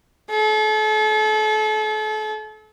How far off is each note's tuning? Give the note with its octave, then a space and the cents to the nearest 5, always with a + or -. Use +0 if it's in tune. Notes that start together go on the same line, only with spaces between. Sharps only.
A4 -40